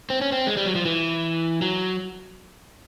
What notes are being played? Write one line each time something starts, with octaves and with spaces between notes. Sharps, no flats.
C4
C#4
C4
G#3
G3
F#3
F3
E3
F#3